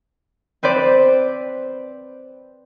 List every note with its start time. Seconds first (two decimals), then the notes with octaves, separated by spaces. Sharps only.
0.63 C4 B4 C5 D5